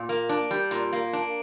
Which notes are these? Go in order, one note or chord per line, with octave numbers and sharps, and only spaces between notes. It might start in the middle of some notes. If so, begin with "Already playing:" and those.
Already playing: A#2
A#3
D4
G3
A#2
A#3
D4